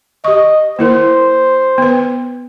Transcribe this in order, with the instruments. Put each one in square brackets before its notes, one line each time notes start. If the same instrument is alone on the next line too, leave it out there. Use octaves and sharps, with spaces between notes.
[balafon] G4 C#6 [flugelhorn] D#5
[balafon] A#3 E4 A#4 [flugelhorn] C5
[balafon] B3 B4